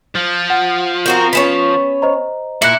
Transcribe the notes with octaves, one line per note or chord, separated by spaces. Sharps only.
F3
F#5
C4 F#4 A#4 G6
B3 C#4 C#5 B6 E7
C5 D#5 A#5
A#2 E4 F#6 C#7